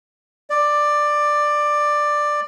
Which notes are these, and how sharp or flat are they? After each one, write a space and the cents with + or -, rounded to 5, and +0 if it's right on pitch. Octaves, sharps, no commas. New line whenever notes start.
D5 +10